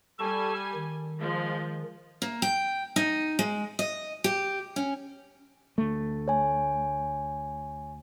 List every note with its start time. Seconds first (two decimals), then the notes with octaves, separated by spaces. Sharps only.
0.19 G3 A4 G#5 A5 C#6
0.74 D#3
1.20 F3 G#3
2.22 A#3
2.42 G5
2.96 D#4
3.39 G#3
3.79 D#5
4.24 G4
4.76 C#4
5.78 D2 A3
6.28 C#5 G#5